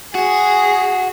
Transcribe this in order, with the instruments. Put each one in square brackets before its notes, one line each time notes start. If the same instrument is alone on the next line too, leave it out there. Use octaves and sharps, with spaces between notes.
[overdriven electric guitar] F#4 [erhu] G#4